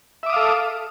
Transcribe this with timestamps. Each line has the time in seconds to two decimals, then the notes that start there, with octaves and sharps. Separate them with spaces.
0.23 E5
0.26 D6
0.30 D#6
0.33 F5
0.36 A4